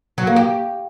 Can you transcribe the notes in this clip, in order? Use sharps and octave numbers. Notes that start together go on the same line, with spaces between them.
F#3
A#3
G4